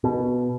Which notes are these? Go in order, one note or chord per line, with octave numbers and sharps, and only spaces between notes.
B2